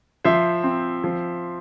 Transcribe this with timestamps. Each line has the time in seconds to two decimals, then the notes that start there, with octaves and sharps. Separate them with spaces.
0.24 F3 C5 E5
0.64 C4
1.04 F3